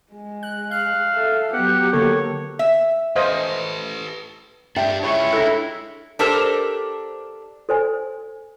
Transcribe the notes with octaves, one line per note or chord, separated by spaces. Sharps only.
G#3
F#6
F5 F#6
A4 E5
F#3 B3 G4 F#5
D3 A#3 A4 C#5
E5
A4 B4 C5 D#5 F5
D4 G4 E5 G5
E4 F4 G#4 C#5 C#6
D4 E4 A4
D4 G4 A4 A#4 C5
A4 C5 G#5